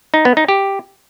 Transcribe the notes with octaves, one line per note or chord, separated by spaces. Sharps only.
D#4
B3
D#4
G4